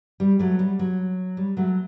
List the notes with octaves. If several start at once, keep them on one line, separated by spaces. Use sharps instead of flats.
G3
F#3 A3
G3
F#3
G3
F#3 A3